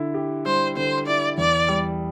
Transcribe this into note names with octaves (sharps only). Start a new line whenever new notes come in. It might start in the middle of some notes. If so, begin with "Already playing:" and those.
Already playing: D3 E4
G4
G3 C5
D3 C5
E4 D5
E2 D5
G3